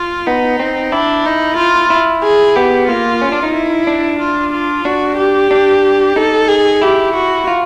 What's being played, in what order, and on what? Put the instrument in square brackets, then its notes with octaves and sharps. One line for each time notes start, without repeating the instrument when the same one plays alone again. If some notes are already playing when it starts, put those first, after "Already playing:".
Already playing: [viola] F4
[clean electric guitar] B3 [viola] D#4
[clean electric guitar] C4
[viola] D4 [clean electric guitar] E4
[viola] D#4
F4
[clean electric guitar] E4
[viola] G#4
[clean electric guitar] B3 [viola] G4
[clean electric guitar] A#3 [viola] F4
[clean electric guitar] C#4
D4
D#4
[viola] E4
[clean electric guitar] D4
[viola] F4
F4
[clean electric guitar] D4 [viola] F#4
[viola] G4
[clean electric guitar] D4
[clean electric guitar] D#4 [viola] A4
[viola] G#4
[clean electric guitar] E4 [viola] G4
[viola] F#4
[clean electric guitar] F4